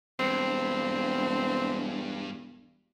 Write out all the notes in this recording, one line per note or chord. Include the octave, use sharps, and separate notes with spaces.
E1 G2 C4